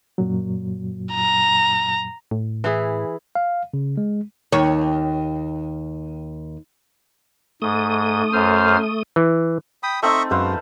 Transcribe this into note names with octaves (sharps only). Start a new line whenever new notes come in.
F#2 A#2 F#3
A#5
A2
E3 E4 G#4
F5
C#3
G#3
D#2 C#5
G#2 A3 D#6
F#2 C5 F6
E3
G5 B5 D#6
A3 C4 D#4 D#5 E5 C#6
F#2 G#3 B4 C5 F5